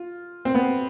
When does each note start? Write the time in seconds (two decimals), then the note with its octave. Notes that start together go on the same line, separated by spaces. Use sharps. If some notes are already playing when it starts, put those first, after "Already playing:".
Already playing: F4
0.45 C4
0.55 B3